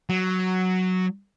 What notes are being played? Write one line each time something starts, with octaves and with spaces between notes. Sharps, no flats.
F#3